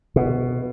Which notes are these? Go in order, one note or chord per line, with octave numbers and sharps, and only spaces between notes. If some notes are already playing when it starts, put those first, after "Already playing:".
B2